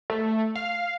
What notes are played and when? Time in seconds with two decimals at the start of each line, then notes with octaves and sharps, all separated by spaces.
0.10 A3
0.56 F5